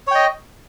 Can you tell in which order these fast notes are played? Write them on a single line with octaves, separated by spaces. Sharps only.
C#5 G5 D#5